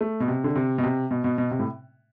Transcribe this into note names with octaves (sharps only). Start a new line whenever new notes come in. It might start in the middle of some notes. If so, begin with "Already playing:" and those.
A3
B2
C3
D3
C3
B2
C3
B2
B2
B2
C3
A2